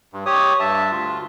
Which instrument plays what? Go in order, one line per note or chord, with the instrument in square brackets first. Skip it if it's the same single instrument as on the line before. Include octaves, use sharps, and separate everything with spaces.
[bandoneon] G2
G4 C#5 D#6
G2 E5 A5
D2 F4